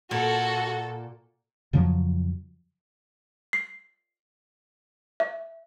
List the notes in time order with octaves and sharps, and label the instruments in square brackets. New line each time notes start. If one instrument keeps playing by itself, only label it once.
[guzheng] A#2 [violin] F#4 [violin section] A4
[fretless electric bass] F2 C#3 F3 F#3
[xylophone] C7
E5